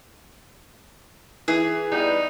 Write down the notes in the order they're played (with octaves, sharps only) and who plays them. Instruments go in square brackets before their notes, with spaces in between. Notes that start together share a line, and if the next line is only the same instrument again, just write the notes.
[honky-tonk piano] E3 [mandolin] G#4
[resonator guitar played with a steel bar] G3 B3 [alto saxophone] D#4